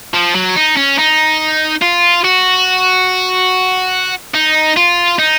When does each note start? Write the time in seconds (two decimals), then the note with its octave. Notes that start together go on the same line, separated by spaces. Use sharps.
0.14 F3
0.35 F#3
0.56 D#4
0.77 C#4
0.98 D#4
1.82 F4
2.24 F#4
4.34 D#4
4.77 F4
5.19 D#4